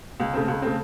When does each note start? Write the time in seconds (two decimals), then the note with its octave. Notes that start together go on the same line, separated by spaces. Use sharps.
0.20 C#2
0.34 C#3 A3 C4
0.48 C#2
0.62 C#3 A3 C4